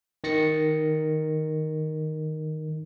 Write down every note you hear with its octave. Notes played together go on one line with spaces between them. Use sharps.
D#3 A6 A#6 C#7